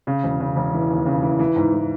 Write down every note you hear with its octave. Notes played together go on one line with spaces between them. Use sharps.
C#3
E1
C#3
E1
E3
D#2
C#3
E3
E3
G#2
E3